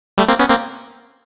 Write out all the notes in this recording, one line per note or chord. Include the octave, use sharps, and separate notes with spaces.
G3 A3
A#3 C4
B3 C#4
A#3 C4